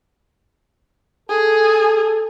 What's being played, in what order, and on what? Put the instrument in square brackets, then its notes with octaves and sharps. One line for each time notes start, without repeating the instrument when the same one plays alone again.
[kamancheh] G#4 [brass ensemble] A4